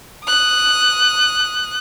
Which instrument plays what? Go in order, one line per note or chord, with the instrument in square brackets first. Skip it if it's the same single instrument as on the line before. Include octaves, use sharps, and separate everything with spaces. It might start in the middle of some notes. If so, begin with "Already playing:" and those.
[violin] D#6 F#6